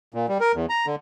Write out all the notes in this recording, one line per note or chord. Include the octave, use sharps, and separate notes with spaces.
A#2
G3
A#4
E2
A#5
D3